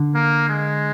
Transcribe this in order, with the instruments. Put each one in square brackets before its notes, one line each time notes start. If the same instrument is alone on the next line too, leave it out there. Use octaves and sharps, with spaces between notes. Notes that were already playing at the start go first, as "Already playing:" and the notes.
Already playing: [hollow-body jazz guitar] D3
[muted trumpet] A#3
G#3